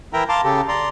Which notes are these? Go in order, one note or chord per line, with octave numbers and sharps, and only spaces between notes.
E3 E4 A#4 E5 G5 A#5
F5 A5 A#5 C6 D6
C#3 G4 A4
D5 A#5 C6